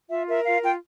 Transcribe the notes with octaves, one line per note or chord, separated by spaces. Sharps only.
F4 E5
A#4 E5
F4 F5
F4 G5